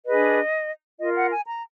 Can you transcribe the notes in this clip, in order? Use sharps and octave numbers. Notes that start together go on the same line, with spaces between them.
D4 G#4 B4 D#5
F4 A#4 D#5
F#5
G#5
A#5